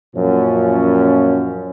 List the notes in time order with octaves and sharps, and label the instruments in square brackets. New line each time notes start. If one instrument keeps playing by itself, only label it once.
[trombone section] F#2 A#2 F3 C#4